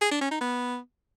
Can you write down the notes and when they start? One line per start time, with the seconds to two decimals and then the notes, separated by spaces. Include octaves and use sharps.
0.01 G#4
0.11 D4
0.21 C#4
0.31 D#4
0.41 B3